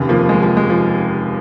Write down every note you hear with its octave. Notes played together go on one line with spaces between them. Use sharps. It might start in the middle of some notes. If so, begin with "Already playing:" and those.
Already playing: F1 D#2 C#3
F3 A#3
G#3
F3
G#3
F3